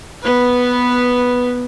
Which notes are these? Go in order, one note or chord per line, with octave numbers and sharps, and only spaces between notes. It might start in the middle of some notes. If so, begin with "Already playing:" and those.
B3 B4